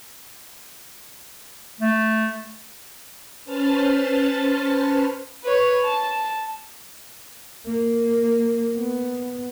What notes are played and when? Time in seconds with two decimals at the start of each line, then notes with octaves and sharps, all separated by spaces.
1.81 A3
3.45 C#4 B4 C5 A5 F6 A6
5.44 B4 C#5
5.84 A5
7.67 A#3
8.77 B3